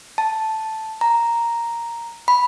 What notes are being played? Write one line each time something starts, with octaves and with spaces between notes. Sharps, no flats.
A5
A#5
B5